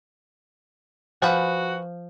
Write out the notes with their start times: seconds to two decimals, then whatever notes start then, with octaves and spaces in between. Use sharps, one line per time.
1.22 F3 F#4 B4 F#5 G#5